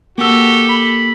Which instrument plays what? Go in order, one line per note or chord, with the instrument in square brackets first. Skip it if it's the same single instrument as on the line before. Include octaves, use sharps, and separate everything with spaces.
[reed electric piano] A#3 E6 [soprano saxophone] F#4 [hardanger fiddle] G4 A4
[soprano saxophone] B5